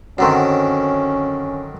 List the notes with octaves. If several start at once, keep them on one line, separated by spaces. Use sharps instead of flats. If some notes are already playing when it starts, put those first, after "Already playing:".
F#2 D3 D#3 F#3 C4 C#4